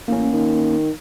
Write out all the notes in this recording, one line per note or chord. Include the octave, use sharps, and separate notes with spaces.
A1 A#3 C#4
D#3